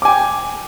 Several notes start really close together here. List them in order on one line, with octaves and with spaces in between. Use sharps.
D6 G#5 G5